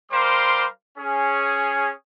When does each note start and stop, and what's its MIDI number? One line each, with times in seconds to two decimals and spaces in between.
0.11 0.64 55
0.11 0.64 70
0.11 0.64 72
0.11 0.64 77
0.11 0.64 84
0.11 0.64 86
0.97 1.91 61
0.97 1.91 68